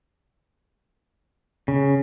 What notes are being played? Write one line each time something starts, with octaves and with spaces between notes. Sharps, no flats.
C#3